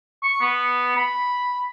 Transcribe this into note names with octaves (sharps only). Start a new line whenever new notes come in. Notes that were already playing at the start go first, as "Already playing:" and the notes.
C#6
B3
B5